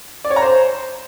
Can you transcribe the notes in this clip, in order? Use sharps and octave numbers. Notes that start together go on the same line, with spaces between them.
D5
C#5
A#5
C5